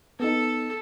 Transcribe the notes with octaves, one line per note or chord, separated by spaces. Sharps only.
B3 D#4 A4